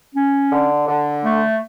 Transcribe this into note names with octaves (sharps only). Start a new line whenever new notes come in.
C#4
D3
D3
A3